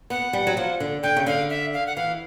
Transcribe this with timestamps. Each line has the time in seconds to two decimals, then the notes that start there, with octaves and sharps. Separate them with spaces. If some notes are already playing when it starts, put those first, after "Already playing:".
0.10 B3 F#5
0.33 G3
0.47 F#3
0.57 F3
0.80 D3
1.03 D3 G5
1.17 C#3
1.26 D3 F5
1.50 E5
1.73 F5
1.87 F#5
1.96 E3 F5